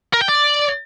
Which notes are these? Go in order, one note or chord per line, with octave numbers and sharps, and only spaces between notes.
A#4
G5
D5